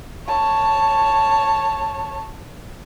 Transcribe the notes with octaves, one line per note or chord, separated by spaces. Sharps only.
C#5 A5